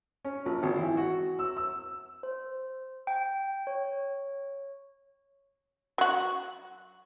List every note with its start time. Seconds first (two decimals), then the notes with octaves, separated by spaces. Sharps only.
0.25 C#4
0.46 A#1
0.63 G#1
0.79 E3
0.97 F#4
1.39 E6
1.57 E6
2.23 C5
3.07 G5
3.67 C#5
5.98 F#3 F#4